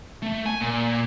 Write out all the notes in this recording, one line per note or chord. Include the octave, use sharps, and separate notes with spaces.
A3
G#5
A#2